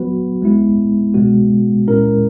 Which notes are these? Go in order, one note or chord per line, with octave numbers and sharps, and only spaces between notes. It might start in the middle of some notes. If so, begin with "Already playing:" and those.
Already playing: F#3 B3 F#4 B4
G#3 B3 E4
B2 G#3 B3 F#4
A#2 G#3 C#4 E4 A#4